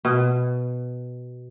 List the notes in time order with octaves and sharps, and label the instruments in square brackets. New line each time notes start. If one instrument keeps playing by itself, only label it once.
[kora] B2